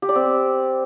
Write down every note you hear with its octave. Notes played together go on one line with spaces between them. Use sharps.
G4
D5
C4